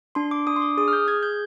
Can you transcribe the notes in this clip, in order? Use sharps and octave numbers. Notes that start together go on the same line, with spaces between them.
D4 C6
D6
D4 D#6
C6
D6
G#4 D#6
F6
G6
G#4 G#6
G6